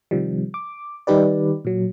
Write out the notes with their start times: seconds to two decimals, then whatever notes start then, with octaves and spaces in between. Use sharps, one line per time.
0.11 C3 D#3 F3 G3
0.54 D6
1.07 D#3 G3 D#4 G4 B4 D5
1.65 A#2 F#3